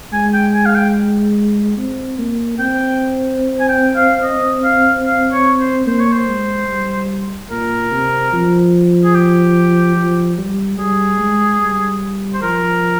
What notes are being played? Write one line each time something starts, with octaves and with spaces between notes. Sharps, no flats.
G#3 G#5
G5
G#5
F5
G5
C4
A#3
C4 G5
G#5
G5
F5
D#5
F5
F5
C#5
C5
A#3 C5
C#5
C5
G#3
G3
A#2 A#4
C3
F3
G#4
G4
F3
G3
G3 G#4
G#3
G3
C5
F3 A#4